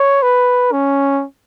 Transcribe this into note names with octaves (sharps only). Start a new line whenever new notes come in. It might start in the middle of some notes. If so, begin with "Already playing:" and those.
Already playing: C#5
B4
C#4